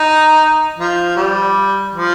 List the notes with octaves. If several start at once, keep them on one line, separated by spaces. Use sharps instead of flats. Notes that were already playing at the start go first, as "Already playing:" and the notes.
Already playing: D#4
F3
G3
F3